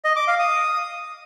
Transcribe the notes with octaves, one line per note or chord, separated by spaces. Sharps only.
D#5
D6
F5
D#6